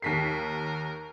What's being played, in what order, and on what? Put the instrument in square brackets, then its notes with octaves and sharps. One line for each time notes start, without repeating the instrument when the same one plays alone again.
[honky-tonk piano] D#2 B6 C7 [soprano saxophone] A#4